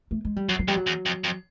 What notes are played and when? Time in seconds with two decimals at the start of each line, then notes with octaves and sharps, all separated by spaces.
0.11 A3
0.25 G#3
0.36 G3
0.48 F#2 F#3
0.59 F#3
0.68 F2 G3
0.77 F#3
0.87 E2
1.06 F2
1.24 F2